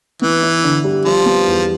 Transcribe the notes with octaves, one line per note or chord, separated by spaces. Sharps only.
E3 B3
E4
D3
G3
F3 G3
B3
E2